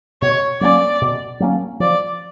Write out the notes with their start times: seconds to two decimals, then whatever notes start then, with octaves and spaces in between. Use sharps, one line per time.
0.22 B2 C#5
0.61 F#3 A#3 C#4 D5
1.02 B2
1.40 F#3 A#3 C#4
1.80 F3 D5